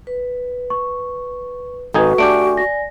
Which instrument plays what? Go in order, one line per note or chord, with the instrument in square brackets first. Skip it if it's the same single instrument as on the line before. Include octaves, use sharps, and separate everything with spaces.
[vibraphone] B4
[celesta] C#6
[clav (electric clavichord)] G#1 D#4 G#5 [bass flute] F#4 [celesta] A4 B4
[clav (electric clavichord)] A3 D4 G4 [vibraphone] D5 G#5 [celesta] D7
[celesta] A#6